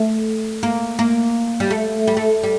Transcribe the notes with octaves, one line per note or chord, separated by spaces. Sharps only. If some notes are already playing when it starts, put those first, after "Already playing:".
Already playing: A3
A#3
A#3
G3
A3
G3
A3
G3